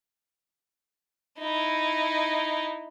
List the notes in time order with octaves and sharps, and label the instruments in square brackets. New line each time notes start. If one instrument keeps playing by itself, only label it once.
[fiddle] D#4 E4